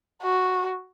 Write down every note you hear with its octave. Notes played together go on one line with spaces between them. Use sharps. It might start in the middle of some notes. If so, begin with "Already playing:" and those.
F#4